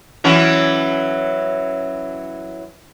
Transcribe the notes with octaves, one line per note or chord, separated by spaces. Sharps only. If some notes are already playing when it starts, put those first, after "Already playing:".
E3 F#3 C#4